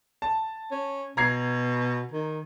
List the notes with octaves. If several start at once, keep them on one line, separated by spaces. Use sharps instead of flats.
A5
C#4
B2 A#5 G#6 C7
D#3